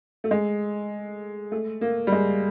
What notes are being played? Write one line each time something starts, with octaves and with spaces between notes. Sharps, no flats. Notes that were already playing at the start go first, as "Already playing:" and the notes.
A3
G#3
A3
A#3
G3
G#3